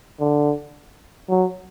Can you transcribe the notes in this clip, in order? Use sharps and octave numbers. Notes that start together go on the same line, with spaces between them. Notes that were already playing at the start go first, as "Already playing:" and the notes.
D3
F#3